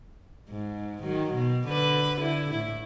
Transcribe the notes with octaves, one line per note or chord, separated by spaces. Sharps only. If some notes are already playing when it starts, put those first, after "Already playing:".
G#2
D#3 F#3
B2
D3 B4
D3 E4
A2 E4